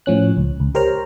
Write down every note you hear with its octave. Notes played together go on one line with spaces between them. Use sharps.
A2 F3 C#4 F#6
C#2
C#2
G4 A#4 C5 C#5 A#5 F6